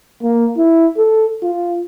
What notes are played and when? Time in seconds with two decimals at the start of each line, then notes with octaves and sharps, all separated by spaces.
0.23 A#3
0.57 E4
0.97 A4
1.43 F4